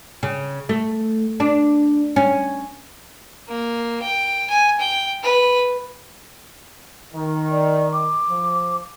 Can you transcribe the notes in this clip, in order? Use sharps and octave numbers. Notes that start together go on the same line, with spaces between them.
C#3
A3
D4
C#4
A#3
G5
G#5
G5
B4
D#3
D5
D6
F3